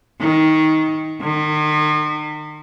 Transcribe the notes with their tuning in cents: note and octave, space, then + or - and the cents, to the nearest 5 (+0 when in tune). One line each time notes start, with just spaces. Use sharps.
D#3 +15
D#3 -40